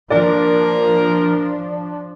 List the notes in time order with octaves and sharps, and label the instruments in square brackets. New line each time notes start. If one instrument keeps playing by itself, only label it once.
[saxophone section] A#2 A#4 [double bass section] F3 [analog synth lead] D4 [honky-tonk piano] D5